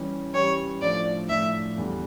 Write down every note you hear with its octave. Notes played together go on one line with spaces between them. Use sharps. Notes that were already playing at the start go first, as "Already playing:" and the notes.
Already playing: E3 G3 C#4 G4
E3 G3 C#4 G4 C#5
A2 F3 A3 D4 D5
A2 F3 A3 D4 E5
E2 D3 G3